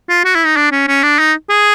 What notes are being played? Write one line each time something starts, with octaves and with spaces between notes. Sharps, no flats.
F4
F#4
E4
D#4
D4
C#4
C#4
D4
D#4
G#4